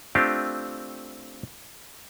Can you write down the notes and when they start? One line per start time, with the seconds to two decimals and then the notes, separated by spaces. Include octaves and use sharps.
0.15 A3 C4 D4 F4 G4